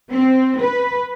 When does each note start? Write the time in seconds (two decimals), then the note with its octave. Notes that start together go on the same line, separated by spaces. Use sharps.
0.11 C4
0.60 B4